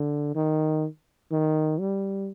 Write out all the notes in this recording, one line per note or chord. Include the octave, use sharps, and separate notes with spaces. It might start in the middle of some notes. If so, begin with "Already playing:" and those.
Already playing: D3
D#3
D#3
G3